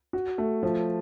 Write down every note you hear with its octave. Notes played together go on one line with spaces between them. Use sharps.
F#4
A3
F3